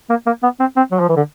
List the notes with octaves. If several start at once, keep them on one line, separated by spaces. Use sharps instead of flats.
A#3
A#3
B3
C4
C4
F#3
F3
E3
D3